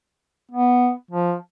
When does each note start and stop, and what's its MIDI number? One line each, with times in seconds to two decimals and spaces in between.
0.51 0.91 59
1.11 1.34 53